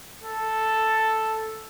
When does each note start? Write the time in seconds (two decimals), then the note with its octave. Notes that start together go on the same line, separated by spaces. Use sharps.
0.24 A4